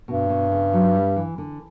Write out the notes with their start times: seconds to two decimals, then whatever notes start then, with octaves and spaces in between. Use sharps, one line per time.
0.08 G2 B2
0.29 B2
0.52 C#3
0.73 F#3
0.95 G3
1.16 E3
1.38 D3